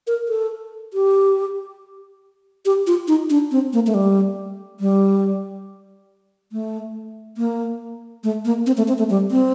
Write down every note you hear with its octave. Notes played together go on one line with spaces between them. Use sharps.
A#4
A4
G4
G4
F4
D#4
D4
C4
A#3
A3
G3
G3
A3
A#3
A3
A#3
C4
A3
C4
A3
G3
C4